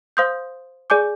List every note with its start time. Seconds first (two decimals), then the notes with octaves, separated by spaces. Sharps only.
0.17 C5 F5 C6 D#6 G6
0.90 G#4 D5 G#5 D6 G6